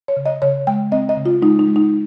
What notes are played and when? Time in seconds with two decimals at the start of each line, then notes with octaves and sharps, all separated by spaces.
0.08 C#5
0.17 C#3
0.26 D#5
0.42 C#3 C#5
0.67 G#3 G5
0.92 C4 D#5
1.09 D#5
1.17 C#3
1.25 F4
1.42 G#3 D#4
1.59 D#4
1.68 G#3
1.76 D#4